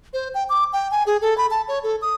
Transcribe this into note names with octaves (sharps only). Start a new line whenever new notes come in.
C5
G5
D6
G5
G#5
G#4
A4
B5
A5
C#5
A4
D#6